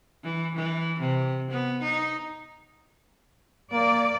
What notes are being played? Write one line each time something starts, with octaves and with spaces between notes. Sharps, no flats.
E3
E3
C3
B3
D#4
A#3 D5